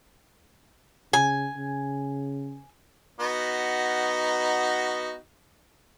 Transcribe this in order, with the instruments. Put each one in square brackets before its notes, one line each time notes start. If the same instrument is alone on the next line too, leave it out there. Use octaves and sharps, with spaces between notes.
[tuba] C#3 [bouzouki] G#5
[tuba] C#3
[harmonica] B3 D#4 F#4